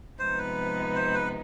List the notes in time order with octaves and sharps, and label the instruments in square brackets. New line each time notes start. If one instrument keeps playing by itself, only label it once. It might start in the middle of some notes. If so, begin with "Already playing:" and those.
[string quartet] C3 F3 G#3 B3 D#4 [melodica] C5
[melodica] B4
C5
B4